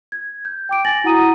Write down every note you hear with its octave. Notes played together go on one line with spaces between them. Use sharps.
G#6
G6
G5 D6 D7
G#5 A6 A#6 F#7
E4 F#4 F#5 A#5 D#6 D#7